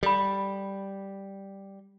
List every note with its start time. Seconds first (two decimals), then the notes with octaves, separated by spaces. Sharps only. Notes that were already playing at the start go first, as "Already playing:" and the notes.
0.03 G3 A4 B5